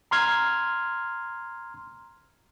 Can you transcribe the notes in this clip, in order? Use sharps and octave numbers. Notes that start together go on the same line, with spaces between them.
A#5 C6 F6 G#6